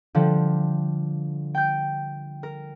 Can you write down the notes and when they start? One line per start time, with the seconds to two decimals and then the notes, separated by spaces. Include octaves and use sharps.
0.15 D3 F3 G3
1.55 G5 G6
2.43 A#4